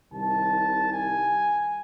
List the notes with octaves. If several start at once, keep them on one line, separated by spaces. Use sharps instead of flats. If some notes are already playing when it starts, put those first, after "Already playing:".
C2 C3 D#3 G3 A5
G#5